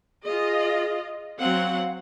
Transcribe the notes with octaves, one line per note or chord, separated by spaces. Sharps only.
F4 G#4 D#5
F#3 C4 F5 F#5